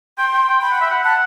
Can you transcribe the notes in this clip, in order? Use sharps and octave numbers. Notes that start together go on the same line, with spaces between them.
G5 C6
G5
G5
G5 B5
F#5
E5
F#5
F#5 A5